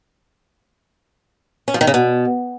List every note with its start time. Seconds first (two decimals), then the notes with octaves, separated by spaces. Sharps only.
1.68 C#4
1.74 F3
1.81 D#3
1.87 C#3
1.94 B2